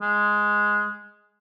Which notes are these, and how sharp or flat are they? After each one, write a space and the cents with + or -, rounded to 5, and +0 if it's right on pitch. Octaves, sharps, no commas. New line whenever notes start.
G#3 +0